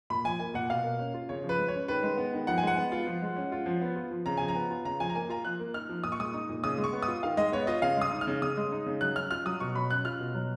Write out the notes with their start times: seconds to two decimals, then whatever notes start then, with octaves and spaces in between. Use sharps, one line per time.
0.10 A#2 B5
0.24 F3 G#5
0.40 A#3 G#5
0.54 A#2 F#5
0.70 B2 F5
0.84 A#3
0.99 C#4
1.14 F4
1.29 C#3 C#5
1.44 F3
1.49 B4
1.58 G#3
1.68 C#5
1.74 C#4
1.88 D#3 B4
2.03 G#3
2.17 B3
2.33 D#3
2.47 F3 F#5
2.58 G#5
2.63 G#3 F#5
2.77 B3
2.92 F4
3.07 F3
3.22 G#3
3.36 C#4
3.52 F4
3.66 F3
3.81 B3
3.96 F4
4.11 F3
4.26 C#3 A#5
4.37 F3 G#5
4.48 A#5
4.55 B3
4.70 F4
4.85 C#3 A#5
5.00 F3 G#5
5.09 A#5
5.15 A#3 G#5
5.29 F4 A#5
5.45 F3 F#6
5.60 A#3
5.74 D#4 F6
5.89 F3
6.04 A#2 D#6
6.12 C#6
6.19 G#3 D#6
6.34 D#4
6.49 A#2
6.64 C#3 D#6
6.78 G#3
6.84 C#6
6.93 B3
7.02 D#6
7.08 F4
7.23 D#3 F5
7.37 G#3 D#5
7.52 B3 C#5
7.67 F4 D#5
7.82 C#3 F5
7.97 G#3 D#6
8.11 D#4
8.21 F6
8.27 C#3
8.42 C#3 D#6
8.57 G#3
8.72 D#4
8.86 C#3
9.01 F#3 F#6
9.15 C#4 F6
9.31 F4 F6
9.45 F#3 D#6
9.60 B2 C#6
9.75 F#3 B5
9.91 C#4 F#6
10.05 F4 F6
10.20 B2
10.35 F#3